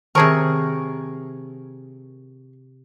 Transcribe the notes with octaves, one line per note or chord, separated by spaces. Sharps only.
C3 D#3 G#4 A#4 C5 A5 C#6